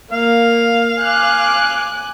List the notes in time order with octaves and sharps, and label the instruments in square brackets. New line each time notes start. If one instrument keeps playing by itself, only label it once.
[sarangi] A#3 [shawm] F5
[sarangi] G#5 [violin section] D6 F#6